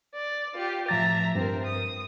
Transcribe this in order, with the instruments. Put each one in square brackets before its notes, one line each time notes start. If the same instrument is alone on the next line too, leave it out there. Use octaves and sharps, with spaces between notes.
[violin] D5
F4 G4
[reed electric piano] A2 F3 A6 [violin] E5 A#5
[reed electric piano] G2 [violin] C4 A#4
[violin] D#6